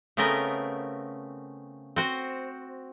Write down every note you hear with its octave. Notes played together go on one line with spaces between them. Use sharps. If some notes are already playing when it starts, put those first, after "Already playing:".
C#3 A3 B3 C4 A#4 D#5
C4 F#4 C5